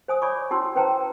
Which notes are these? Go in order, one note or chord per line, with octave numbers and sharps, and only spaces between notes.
C5 G#5 D#6
C#5 D5 G#5 B5 C#6 D6
C#4 E4 F#4 A5 C6 E6
C#4 B4 C5 G5 A5 A#5